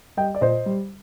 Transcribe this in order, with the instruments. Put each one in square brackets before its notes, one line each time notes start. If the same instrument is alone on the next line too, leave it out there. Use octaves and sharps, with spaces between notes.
[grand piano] G3 D#5 G5
D5
A#2 C5 D#5
G3